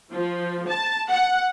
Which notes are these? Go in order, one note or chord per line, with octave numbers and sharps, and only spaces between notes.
F3
A5
F#5